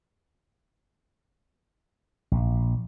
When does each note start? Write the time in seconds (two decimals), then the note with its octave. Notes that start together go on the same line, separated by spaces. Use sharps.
2.32 A#1